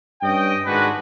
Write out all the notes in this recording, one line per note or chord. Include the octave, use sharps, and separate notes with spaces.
G2 C#4 D#5 G5
G#2 D#3 G#3 D4 F#4 B4